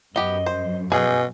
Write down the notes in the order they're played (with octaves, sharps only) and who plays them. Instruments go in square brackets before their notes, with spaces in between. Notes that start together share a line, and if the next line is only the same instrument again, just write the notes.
[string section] F#2 [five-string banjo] B3 G4 [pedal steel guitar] D#5
[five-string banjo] C5
[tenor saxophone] B2 [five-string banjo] G#4 [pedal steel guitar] G#5 F#6 G6